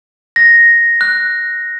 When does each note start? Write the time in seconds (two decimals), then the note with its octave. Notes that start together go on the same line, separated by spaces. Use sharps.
0.36 A#6
1.01 F#6